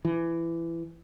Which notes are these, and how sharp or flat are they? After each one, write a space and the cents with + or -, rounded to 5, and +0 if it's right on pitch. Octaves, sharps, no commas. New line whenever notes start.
E3 +20